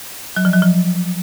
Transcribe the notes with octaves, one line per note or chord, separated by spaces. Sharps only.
F#3
F3
F#3
F3